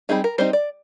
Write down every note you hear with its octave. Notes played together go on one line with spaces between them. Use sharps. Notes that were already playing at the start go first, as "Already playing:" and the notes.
G3 C4 D#4 G#4
A#4
G3 C4 D#4 C5
D5